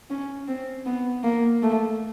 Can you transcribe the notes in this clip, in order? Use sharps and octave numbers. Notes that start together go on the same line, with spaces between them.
C#4
C4
B3
A#3
A3